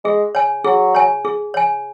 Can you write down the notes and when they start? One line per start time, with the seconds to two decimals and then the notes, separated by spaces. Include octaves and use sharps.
0.04 G#3 G#4
0.35 C#5 G#5
0.64 F#3 G#4
0.95 C#5 G#5
1.25 G#4
1.54 C#5 G#5